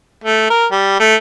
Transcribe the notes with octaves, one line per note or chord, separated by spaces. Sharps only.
A3
A#4
G3
A3